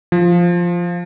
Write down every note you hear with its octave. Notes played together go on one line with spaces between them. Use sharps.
F3